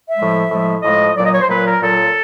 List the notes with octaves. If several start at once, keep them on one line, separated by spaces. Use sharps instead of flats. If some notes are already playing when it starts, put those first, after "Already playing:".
E5
A2 F3 G#3
A2 F3 G#3
A2 F3 G#3 D#5
A#2 F#3 D5
D#5
C#5
C5
A#2 F#3 B4
A#4
A#2 F#3 A4